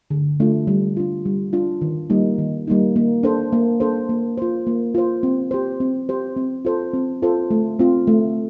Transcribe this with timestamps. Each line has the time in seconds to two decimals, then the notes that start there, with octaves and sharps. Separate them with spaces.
0.10 D3
0.40 A3 D4 F4
0.67 G3
0.97 D4 F4
1.25 G3
1.53 D4 F4
1.81 D#3
2.10 G3 A#3 D#4
2.38 D#3
2.68 G3 A#3 D#4
2.96 A#3
3.23 D4 A4 C5
3.53 A#3
3.80 D4 A4 C5
4.09 A#3
4.38 F4 C5
4.67 A#3
4.95 F4 C5
5.23 C4
5.51 G4 C5
5.80 C4
6.09 G4 C5
6.37 C4
6.65 F4 A4 C5
6.94 C4
7.22 F4 A4 C5
7.51 A3
7.79 C4 F4
8.07 A3